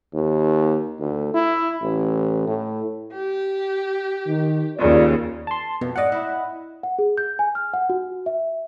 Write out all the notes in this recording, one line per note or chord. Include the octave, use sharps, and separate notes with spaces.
D#2
D2
E4
A1
A2
G4
D#3
D#2 C#3 F4 D5
A5 C6
F2 B2
G#2 D5 D#5 F#5
E4
F#5
G#4
G6
G#5
F6
F#5
F#4
E5